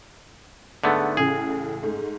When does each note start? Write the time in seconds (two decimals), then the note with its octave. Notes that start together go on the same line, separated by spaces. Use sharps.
0.84 G#2 D3 A3 B3
1.17 A1 A2 C#3 G#4
1.83 G#2 A3